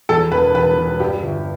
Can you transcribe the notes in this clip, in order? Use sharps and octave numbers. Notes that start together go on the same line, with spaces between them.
E2 A4
E1 B4
E1 B4
E1
G2 G4
G1